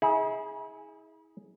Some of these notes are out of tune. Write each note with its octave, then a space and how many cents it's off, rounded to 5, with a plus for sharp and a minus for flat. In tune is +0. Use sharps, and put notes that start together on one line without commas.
E4 -40 G#4 +0